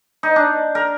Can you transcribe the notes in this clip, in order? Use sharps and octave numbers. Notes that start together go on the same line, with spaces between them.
D#4
D4
A#4